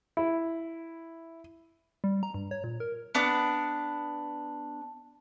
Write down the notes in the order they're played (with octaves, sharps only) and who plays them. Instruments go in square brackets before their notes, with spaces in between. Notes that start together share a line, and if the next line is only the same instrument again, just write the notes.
[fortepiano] E4
[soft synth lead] G3
A#5
G2
C#5
A#2
A#4
[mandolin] B3 D4 D6